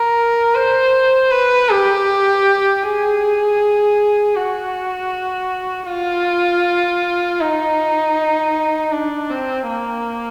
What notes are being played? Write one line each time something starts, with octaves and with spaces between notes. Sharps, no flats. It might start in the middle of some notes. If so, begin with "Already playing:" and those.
Already playing: A#4
C5
B4
G4
G#4
F#4
F4
D#4
D4
C4
A#3